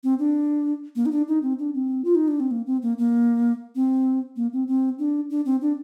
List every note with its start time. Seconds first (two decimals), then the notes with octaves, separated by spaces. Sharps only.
0.04 C4
0.19 D4
0.96 A#3
1.06 D#4
1.11 D4
1.28 D#4
1.43 C4
1.59 D4
1.74 C4
2.05 F4
2.15 D#4
2.28 D4
2.40 C4
2.51 A#3
2.66 C4
2.82 A#3
2.98 A#3
3.75 C4
4.36 A#3
4.53 C4
4.68 C4
4.99 D4
5.30 D4
5.46 C4
5.61 D4